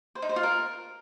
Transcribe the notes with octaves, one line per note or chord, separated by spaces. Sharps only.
C5
D#4
C5
F4
A#4